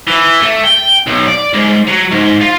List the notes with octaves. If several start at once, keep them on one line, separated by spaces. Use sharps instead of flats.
E3
A3
G5
B1
D5
G#2
F#3
G#2
F4